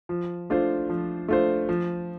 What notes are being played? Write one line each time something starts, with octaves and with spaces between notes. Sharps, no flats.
F3
A3 D4 F4 C5
F3
A3 D4 F4 C5
F3